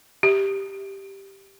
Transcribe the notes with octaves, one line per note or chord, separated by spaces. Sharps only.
G4